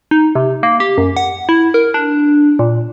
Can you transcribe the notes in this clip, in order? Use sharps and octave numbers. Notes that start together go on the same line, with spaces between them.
D#4
C3
A#3
G4
F#2
F#5
E4
A#4
D4
A#2